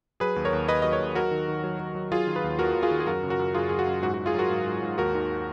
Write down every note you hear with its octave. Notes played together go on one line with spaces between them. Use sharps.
F#3 G#4 B4
D#2
A#4 C#5
D#2
D#2 B4 D#5
F#3 D#5
A#4 C#5
D#2
F#3 F#4 A#4
D#3
D#3
F#3
F#3
F#3
F#3 F4 G#4
D#3
G#4 B4
D#2
D#2 F#4 A#4
D#2
F4 G#4
D#3
G#4
F#2 F#4 A#4
C#3
F#4 A#4
F#2
F#2 F4 G#4
F#2 G#4
F#4
F#2
G#2 F#4
F#4
G#2
F4 G#4
F#3 F#4 A#4
G#2
G#2
G#2
D#2 F#4 A#4
D#3